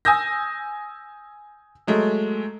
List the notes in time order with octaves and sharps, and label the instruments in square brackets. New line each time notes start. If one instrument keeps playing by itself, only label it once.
[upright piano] G#5 D#6 E6 G6 A#6
F#3 G#3 A3